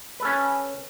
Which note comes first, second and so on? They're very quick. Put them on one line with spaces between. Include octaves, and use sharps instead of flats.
B4 A4 C#4